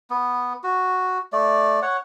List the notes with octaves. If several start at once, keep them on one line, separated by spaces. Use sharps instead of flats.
B3
F#4
A3 D5
C#5 F#5